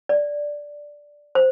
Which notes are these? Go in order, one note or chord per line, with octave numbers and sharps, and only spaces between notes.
D5
C5